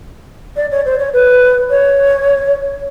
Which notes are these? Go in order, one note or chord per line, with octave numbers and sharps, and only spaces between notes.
D5
C#5
C5
C#5
B4
C#5